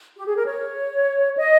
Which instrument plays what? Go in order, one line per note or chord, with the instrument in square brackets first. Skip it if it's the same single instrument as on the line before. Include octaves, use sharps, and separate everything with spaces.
[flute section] G4
G#4
A#4
C#5
D#5